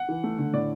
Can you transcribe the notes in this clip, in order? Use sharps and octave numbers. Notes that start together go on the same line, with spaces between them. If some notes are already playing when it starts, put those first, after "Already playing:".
Already playing: F#5
E3
A3
D3
A2 D5